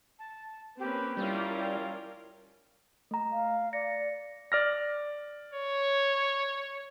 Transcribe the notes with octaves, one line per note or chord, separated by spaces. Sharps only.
A5
A#3 C4 C#4 G4 B4
G3 C#4 E4 F4 A#4 F5
A3 A#5
F5
D5 A#6 C#7
D5 F6 A#6
C#5